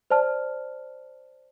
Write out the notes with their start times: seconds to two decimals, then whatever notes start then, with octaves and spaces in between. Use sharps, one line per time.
0.10 C5 D5 A5 F6